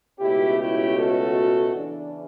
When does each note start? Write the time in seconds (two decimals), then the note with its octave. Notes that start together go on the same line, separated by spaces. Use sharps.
0.19 C#2 B2 A3 C#4 E4 G4
0.58 E4 G4
0.97 F#4 A4
1.75 E2 C#3 E3 D4